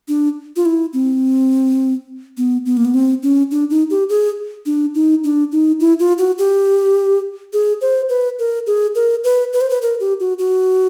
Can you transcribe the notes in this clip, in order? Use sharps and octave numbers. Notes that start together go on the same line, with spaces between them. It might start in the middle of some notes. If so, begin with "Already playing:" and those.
D4
F4
E4
C4
B3
B3
A#3
B3
C4
C#4
D4
D#4
G4
G#4
D4
D#4
D4
D#4
E4
F4
F#4
G4
G#4
C5
B4
A#4
G#4
A#4
B4
B4
C5
B4
A#4
G4
F#4
F#4